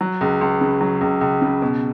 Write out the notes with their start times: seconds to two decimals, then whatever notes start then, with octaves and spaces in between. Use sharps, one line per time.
0.01 F#3
0.21 C#2
0.41 C#2
0.61 C#3
0.81 F#3
1.01 C#2
1.21 C#2
1.42 C#3
1.62 B2